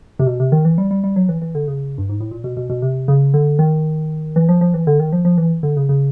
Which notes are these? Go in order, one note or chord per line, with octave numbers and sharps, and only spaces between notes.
C3
B2
C3
D#3
E3
G3
G3
G3
F#3
E3
E3
D3
C#3
G2
G#2
A2
A#2
B2
B2
B2
C3
C#3
D3
D#3
E3
F3
F3
E3
D3
D#3
F3
F3
E3
D3
C#3
C#3